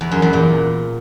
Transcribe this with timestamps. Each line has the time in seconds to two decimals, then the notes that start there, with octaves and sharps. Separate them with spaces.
0.01 E2
0.12 F#2
0.22 E2
0.33 A#2